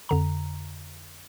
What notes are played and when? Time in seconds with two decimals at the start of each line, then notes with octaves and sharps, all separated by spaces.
0.09 F2 D3 A#5